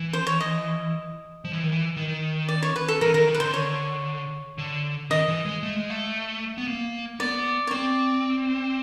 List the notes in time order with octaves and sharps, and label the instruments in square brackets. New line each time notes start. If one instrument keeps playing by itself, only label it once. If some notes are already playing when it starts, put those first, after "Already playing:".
Already playing: [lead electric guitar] E3
[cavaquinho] C5
C#5
D#5
[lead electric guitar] F3
E3
D#3
E3
D#3
[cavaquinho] D5
C#5
B4
A4
[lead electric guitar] E3 [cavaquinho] A#4
[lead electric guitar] D#3 [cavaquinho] A#4
[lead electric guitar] D#3
[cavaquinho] B4
[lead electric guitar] D3 [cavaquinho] C5
[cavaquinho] C#5
[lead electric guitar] D3
[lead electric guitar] D#3 [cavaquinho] D#5
[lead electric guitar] E3
G#3
A3
G#3
A3
B3
A#3
[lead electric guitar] B3 [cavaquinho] D5
[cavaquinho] C#5
[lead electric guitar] C4 [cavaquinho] D5